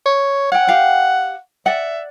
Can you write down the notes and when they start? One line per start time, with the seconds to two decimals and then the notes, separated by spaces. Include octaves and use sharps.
0.06 C#5
0.52 C#5 F#5 G5
0.67 G4 F5 G5
1.66 D5 E5 F#5